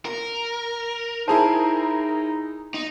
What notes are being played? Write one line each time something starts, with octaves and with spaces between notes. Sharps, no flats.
A#4
D#4 E4 G#4 C5 G#5 A5
D#4